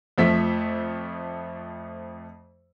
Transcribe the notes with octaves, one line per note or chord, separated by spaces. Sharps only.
F2 F3 A3 E5 B6